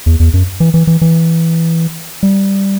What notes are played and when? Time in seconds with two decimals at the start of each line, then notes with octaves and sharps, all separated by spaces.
0.06 E2
0.20 E2
0.33 F#2
0.60 E3
0.74 E3
0.87 E3
1.01 E3
2.23 G3